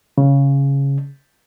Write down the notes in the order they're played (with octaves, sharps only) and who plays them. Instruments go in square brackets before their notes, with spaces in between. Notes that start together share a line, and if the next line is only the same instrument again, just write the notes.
[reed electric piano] C#3